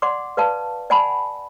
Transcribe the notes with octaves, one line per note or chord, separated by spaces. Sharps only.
D5 F#5 C6 D6
B4 D5 F5 A5
D5 F#5 G#5 A5 B5